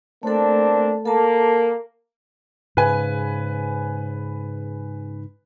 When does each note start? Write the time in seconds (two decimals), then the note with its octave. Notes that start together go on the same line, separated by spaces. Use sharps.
0.23 A3 A#3 C4 D4 A4
1.05 A#3 A4 A5
2.77 G#2 C#3 B4 G#5